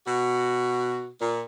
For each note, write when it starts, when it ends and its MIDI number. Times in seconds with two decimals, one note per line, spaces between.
0.05 1.08 47
0.05 1.08 66
1.19 1.41 46